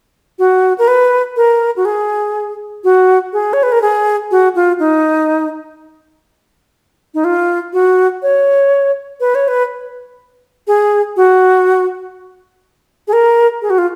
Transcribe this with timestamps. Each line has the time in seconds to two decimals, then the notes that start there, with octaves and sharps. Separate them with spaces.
0.39 F#4
0.78 A#4
0.88 B4
1.36 A#4
1.76 F#4
1.85 G#4
2.84 F#4
3.33 G#4
3.53 C#5
3.63 B4
3.72 A#4
3.82 G#4
4.31 F#4
4.55 F4
4.79 D#4
7.14 D#4
7.24 F4
7.73 F#4
8.22 C#5
9.20 B4
9.35 C#5
9.48 B4
10.67 G#4
11.16 F#4
13.08 G#4
13.13 A#4
13.62 G#4
13.70 F#4
13.78 F4